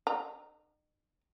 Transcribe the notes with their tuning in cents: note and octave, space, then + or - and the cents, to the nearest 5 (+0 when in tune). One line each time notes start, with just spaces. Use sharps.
D#4 -45 G5 -35 A#5 +0